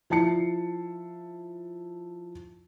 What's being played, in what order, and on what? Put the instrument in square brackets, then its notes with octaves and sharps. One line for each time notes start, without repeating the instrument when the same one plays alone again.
[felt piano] F3 E4 A5 C7 C#7